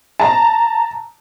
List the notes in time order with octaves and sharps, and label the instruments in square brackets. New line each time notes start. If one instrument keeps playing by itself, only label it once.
[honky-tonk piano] A5 A#5